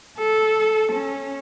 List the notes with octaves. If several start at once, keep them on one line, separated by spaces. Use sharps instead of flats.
A4
C#4